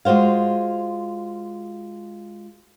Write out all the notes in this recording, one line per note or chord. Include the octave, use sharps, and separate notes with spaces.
G#3 F4 F#4 C5 F5